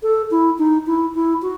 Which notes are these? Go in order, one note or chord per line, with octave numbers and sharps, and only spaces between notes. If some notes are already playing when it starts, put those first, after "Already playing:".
A4
E4
D#4
E4
E4
F#4